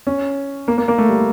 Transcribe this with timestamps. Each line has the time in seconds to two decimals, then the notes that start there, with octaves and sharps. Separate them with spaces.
0.07 C#4
0.68 A#3
0.78 A#3
0.88 A#3
0.98 A3
1.09 G3